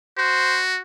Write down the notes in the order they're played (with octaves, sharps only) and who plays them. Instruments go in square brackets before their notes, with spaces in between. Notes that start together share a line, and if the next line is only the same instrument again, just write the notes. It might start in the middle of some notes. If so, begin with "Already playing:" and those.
[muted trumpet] F#4 [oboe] C5